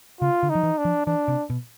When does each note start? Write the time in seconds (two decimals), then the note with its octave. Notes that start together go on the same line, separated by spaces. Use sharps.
0.21 C#3 F4
0.43 D3
0.50 D#4
0.55 F3
0.63 E3
0.78 D4
0.85 F3
1.06 E3 D4
1.28 C3
1.50 B2